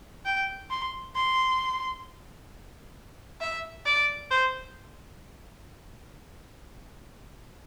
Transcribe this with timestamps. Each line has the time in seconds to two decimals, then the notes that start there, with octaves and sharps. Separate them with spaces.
0.25 G5
0.70 C6
1.15 C6
3.41 E5
3.86 D5
4.31 C5